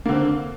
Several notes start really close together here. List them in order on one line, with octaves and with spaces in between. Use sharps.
A#3 D3 C4